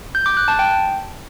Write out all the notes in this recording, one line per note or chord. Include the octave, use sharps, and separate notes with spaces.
G6
D6
F#6
A5
G5